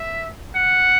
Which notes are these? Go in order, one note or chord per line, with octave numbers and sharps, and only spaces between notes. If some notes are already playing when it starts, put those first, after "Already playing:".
Already playing: E5
F#5